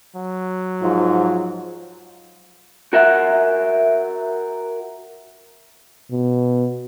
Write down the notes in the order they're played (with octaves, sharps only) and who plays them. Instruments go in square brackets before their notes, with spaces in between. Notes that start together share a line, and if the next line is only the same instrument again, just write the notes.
[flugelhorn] F#3
[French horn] G#2 [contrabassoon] F3
[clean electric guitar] F#4 A#4 E5 F#5
[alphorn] B2